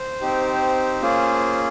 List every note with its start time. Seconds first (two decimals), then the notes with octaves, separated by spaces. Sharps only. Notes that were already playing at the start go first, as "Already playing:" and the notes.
Already playing: C5
0.21 C4 D#4 G4
1.02 A#3 C#4 F4 G#4